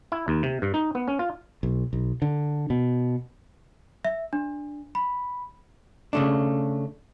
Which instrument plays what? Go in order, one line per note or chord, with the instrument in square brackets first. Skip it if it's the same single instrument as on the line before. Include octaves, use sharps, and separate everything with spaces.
[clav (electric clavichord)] E4
D#2
C3
G2
D#4
B3
C#4
F4
[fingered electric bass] B1
B1
D3
B2
[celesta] E5
D4
B5
[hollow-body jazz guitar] C#3 A3 D4